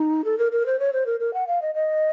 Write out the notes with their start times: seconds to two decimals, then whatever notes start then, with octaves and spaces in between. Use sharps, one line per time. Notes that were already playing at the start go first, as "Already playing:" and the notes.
Already playing: D#4
0.25 A4
0.38 A#4
0.52 A#4
0.66 C5
0.79 C#5
0.93 C5
1.06 A#4
1.20 A#4
1.34 F#5
1.47 F5
1.62 D#5
1.75 D#5